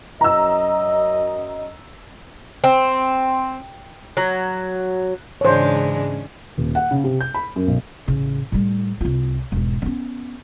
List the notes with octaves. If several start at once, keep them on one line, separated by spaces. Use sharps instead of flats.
F#2 D#5 A#5 E6
C4
F#3
G#2 C#3 E3 G#3 D4 C5 C#5
D#1
F#5
C#3
C3
G6
B5
F#2
B1
A1 C#3
A2 G3
C2 F4
E1 G#2
B3 C#4